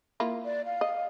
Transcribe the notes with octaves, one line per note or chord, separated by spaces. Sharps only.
A#3 E4 F4
D5
F5
D#5